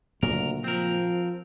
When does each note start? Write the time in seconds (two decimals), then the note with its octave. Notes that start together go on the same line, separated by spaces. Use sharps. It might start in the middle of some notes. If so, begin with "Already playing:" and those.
0.23 D2 A#2 C#3 F#3 A#4
0.64 F3 C4 A#4